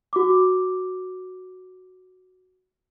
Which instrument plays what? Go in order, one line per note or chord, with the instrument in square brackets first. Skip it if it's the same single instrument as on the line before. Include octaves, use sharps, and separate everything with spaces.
[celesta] F#4 D6